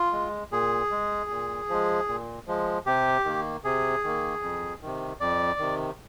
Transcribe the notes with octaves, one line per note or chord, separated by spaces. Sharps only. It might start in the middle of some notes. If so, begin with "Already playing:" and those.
Already playing: F4
G#3
A#2 G#4
G#3
A#2
F3 G#3
A#2
F3 G#3
C3 G4
D#3 A#3
C3 G#4
D#3 A#3
F2
C3 D#3
F2 D5
C3 D#3